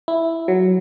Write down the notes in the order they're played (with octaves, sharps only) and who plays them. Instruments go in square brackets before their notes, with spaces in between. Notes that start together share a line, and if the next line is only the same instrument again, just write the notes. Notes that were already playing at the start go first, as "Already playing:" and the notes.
[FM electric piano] E4
F#3